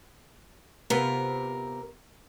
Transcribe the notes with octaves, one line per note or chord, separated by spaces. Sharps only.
C3 B3 F4 A#4